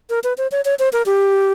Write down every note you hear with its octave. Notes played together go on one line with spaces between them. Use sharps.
A#4
B4
C5
C#5
C#5
C5
A#4
G4